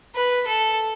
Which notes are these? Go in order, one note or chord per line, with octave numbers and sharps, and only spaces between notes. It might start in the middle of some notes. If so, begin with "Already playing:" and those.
B4
A4